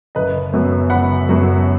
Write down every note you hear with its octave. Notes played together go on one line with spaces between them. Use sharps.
F#1 B4 D#5
F#2 F#3 B3
F#1 F#5 B5
F#2 F#3 B3